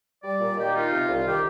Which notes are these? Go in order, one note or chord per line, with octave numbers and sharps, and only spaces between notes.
G3 D5
A#2
D#3 G4
D#4 F4
C3
C2
D#3 G4